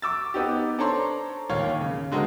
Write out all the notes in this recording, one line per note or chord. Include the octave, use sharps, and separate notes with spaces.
C#6 D6 E6 A6
B3 D#4 G4
D4 A4 C5 C#5 A#5 C6
D#2 A#2 C#5 F5
C#3
D3 G#3 F#4 A#4 C5